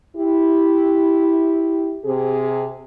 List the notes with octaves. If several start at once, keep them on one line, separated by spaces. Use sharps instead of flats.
E4 G4
C3 G#4